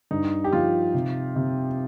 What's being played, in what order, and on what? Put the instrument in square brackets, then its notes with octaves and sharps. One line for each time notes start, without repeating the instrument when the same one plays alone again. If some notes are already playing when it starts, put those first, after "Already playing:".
[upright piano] G2 [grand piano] D#4
[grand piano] G4
[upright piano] F3 [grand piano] F4
[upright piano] C3
C3